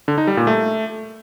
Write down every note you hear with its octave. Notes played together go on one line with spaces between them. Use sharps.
D3
D#4
G3
A#2
A3